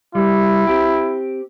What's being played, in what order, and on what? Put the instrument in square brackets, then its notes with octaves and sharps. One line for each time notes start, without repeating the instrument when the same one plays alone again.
[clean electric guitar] G3 [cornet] E4
[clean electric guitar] C4 G4